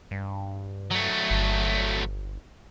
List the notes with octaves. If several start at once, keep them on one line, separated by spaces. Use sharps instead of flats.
G2
F#3 A3
G1